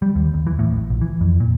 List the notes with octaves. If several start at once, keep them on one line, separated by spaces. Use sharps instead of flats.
G3
D#2
D#2
E3
A2
A1
A#1
E3
F2
A#2